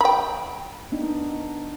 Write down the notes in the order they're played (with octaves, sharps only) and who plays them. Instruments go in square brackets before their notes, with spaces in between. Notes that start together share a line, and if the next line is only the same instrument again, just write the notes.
[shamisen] G5 B5
[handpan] B3 D4 D#4